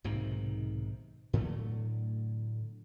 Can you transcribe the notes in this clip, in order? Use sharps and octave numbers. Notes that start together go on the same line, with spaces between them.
B1 G#2 C3 D#3
A2 D3 F#3 A3